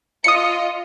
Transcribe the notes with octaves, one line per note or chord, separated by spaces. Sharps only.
F4 D#5 D#6 C#7